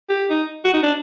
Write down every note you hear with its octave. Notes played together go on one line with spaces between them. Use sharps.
G4
D#4
F#4
D#4
D4